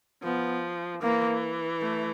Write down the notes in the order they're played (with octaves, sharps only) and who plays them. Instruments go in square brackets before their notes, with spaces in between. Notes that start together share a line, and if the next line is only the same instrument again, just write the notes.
[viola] F3 [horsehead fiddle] B3
[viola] E3 [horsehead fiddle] A#3
[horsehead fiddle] A3